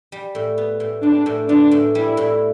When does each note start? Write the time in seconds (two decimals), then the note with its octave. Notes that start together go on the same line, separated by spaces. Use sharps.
0.12 G3
0.35 A2
0.58 B3
0.80 A2
1.03 G3 D4
1.26 A2
1.49 B3 D4
1.71 A2
1.95 G3 E4
2.17 A2